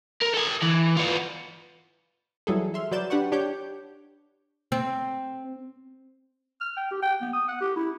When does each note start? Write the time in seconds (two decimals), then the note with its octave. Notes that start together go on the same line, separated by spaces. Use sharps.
0.22 A#4
0.34 A4 G#5
0.62 E3
0.96 B3 F4
2.47 E3 F#3 G3 G#4 A4
2.74 E5 C6 F6
2.92 F#3 B4 D5 G6 A6 E7
3.10 D4 G4 B4 F#5 C#6
3.32 D4 G4 C#5 D6 G6
4.72 C4
6.61 F6
6.77 G5
6.91 G4
7.03 G5
7.21 B3
7.33 D#6
7.48 F#5
7.61 G4
7.76 E4